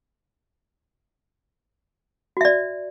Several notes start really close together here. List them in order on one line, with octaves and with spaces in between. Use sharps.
F#4 E5 D5